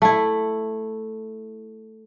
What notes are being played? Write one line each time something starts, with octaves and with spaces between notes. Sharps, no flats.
A3 E4